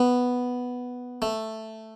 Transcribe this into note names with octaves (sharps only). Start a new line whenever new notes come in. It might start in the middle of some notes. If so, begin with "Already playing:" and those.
Already playing: B3
A3